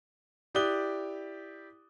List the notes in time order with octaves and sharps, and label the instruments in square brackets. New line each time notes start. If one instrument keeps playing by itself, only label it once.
[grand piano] E4 G4 D5 D#6 F#6 G7